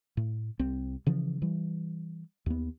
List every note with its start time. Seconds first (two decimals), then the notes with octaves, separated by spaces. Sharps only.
0.17 A2
0.59 C2 C4
1.07 C#3 E3 F3
1.42 E3 G3
2.46 D#2 B3